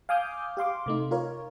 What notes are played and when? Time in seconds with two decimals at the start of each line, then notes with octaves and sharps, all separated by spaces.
0.09 F5 G#5 D6 D#6 F6 G6
0.57 G4 F5 C6 D6
0.86 C3 A3 D#4
1.11 F4 A#4 C#5